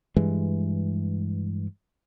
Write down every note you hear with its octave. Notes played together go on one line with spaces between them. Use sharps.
G2 E3 G#3